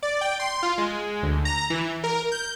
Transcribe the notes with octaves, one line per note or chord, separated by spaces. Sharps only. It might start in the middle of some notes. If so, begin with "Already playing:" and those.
D5
G5
C6
F4
G#3
D2
A#5
E3
A#4
G6